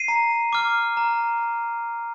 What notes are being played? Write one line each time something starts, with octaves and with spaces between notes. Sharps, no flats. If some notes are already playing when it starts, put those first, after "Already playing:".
Already playing: C7 D#7
A#5
D6 F6
A#5